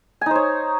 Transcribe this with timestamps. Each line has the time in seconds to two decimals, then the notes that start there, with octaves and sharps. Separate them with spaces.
0.21 G#5
0.26 D#4
0.31 C5
0.35 C#5